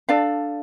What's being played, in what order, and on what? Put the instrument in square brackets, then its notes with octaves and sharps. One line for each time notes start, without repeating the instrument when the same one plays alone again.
[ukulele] D4 A4 D5 F5